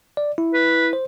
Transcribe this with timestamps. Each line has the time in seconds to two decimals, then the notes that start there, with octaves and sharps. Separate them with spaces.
0.17 D5
0.38 E4
0.54 B4
0.93 C5